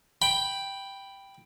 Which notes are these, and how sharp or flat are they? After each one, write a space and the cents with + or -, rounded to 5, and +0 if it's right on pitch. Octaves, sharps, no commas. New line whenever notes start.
G5 +0 B5 +0